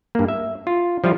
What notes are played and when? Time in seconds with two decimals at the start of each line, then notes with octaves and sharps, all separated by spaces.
0.15 G2 A#3
0.28 E5
0.67 F4
1.04 F3 G3 E4 F4